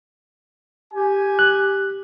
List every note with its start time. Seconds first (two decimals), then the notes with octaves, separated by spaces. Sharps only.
0.94 G4 G#5
1.39 F#6